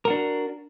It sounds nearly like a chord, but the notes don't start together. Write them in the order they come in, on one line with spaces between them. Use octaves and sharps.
A#4 F#4 D4